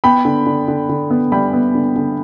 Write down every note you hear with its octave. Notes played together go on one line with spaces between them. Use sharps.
B3 G5 B5
D3
D3
D3
D3
B3
G3 G5 B5
B3
D3
D3